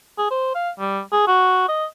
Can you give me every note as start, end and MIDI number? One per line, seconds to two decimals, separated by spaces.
0.18 0.28 68
0.31 0.52 72
0.55 0.70 77
0.79 1.00 55
1.12 1.24 68
1.27 1.64 66
1.69 1.85 75